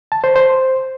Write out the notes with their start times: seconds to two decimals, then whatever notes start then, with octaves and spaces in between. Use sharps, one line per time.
0.12 A5
0.24 C5
0.36 C5